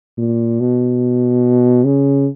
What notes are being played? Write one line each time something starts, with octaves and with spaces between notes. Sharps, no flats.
A#2
B2
C#3